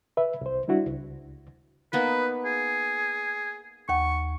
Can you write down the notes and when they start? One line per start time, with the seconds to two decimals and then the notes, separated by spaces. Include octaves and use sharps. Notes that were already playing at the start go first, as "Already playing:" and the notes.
0.17 B4 E5
0.41 C2 C5
0.68 G3 D4 E4 F#4
0.86 C#2
1.93 A#3 B3 D#4 B4
2.45 G#4
3.89 D#2 F#5 C#6